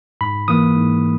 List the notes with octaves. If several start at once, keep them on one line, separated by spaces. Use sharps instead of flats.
G#2 B5
E3 A#3 D#6
G#2